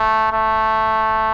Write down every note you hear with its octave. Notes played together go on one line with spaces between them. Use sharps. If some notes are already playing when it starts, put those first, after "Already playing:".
Already playing: A3
A3